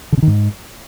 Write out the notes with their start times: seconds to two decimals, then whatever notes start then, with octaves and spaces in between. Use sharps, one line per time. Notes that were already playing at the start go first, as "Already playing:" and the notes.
0.12 D3
0.17 C3
0.22 D#3
0.27 G#2